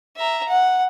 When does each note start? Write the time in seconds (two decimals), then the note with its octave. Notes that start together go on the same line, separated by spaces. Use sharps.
0.17 E5 A#5
0.49 F#5